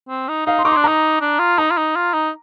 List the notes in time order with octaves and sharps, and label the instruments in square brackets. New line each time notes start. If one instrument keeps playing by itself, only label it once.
[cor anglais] C4
D#4
[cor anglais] D#4 [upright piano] F5
[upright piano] C6
[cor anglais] D#4 [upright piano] D6
[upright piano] C6
[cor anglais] D4
[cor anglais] D#4 [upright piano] A#5
[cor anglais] D4
F4
[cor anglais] D#4 [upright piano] A#5
[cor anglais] F4
D#4
F4
D#4